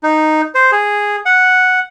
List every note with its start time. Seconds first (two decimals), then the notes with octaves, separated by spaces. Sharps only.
0.03 D#4
0.55 C5
0.72 G#4
1.26 F#5